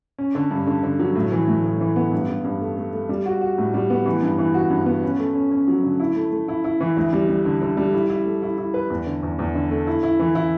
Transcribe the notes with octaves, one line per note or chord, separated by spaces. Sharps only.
C#4
D3
G2
D3
D3
F#3
A2
E3
A2
A2
E3
B3
G2
G2
G2
A3
A3
A3
G3
F#4
F#4
A2
G3
B3
E3
G2
E3
F#4
G2
B3
C#4
A3
C#4
C#4
F#3
D3
E4
A3
A3
E4
E4
E3
D2
G3
G3
D3
D3
G3
E4
E4
A3
E4
E4
B4
E2
D3
E2
E2
D3
A3
E4
E4
E3
E4